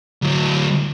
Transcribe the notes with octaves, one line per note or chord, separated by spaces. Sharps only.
D2 F#3